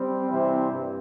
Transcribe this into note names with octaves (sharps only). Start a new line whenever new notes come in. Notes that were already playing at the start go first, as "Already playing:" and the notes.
Already playing: G3 C4
C3 E3 G3 C4 E4
G2